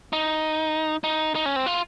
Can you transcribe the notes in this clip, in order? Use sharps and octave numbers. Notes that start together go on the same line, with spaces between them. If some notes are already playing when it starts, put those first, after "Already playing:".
D#4
D#4
D#4
C#4
C4
F4